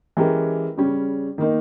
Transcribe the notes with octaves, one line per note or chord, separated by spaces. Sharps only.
E3 G#3 C#4 G4 A#4
C#3 G3 C#4
D#3 A#3 D#4